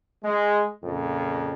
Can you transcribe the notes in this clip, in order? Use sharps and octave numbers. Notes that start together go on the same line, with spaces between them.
G#3
F2 A#2 C#3